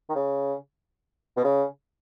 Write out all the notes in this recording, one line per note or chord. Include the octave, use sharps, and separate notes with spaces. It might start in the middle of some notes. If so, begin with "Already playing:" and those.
D#3
C#3
B2
C#3